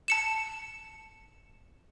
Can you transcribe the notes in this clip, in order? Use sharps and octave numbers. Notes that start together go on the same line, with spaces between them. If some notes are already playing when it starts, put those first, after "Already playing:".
A5 C#7 E7